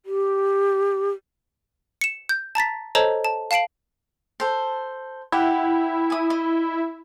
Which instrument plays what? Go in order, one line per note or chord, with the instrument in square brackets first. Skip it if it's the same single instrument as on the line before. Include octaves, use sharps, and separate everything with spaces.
[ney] G4
[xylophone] C#7 E7
G6
A5 A#5 A6 B6
A4 C5 C#5 D#5 A5 A#5
A5
F5 A5 C7 D7 F#7
[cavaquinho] A4 C5
[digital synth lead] E4 [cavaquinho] G4 B4 F#5
[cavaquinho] G#5 D#6
D#5